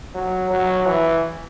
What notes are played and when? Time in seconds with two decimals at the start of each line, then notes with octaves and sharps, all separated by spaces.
0.14 F#3
0.50 F#3
0.86 E3